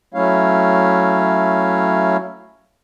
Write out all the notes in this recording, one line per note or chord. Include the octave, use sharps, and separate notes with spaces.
F#3 A3 C#4 E4 C#5 F5